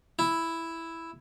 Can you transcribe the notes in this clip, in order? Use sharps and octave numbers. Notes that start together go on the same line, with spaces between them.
E4